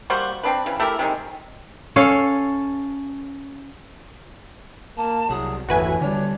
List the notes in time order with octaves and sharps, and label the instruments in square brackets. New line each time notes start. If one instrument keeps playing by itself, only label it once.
[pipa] G3 A#3 F#4 C5
C4 D4 B4
C#3 E3
A3 E4 G4 A#4
C3 D#3 G#3
[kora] C#4 A4 C#5 F5
[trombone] A#3 [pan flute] A5
[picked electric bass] C2 [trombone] F#3 [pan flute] G#4
[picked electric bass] G1 E2 [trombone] A2 [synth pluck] F#4 B4 G#5 [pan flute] E5
[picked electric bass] D3 E3 G3 [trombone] D4 [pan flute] C#5